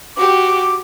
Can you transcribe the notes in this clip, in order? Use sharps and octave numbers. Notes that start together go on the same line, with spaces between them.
F#4 G4 D6